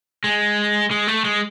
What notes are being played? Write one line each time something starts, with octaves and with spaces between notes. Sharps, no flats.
G#3
G#3
A3
G#3